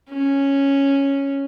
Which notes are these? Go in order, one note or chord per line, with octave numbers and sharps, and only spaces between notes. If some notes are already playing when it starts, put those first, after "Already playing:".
C#4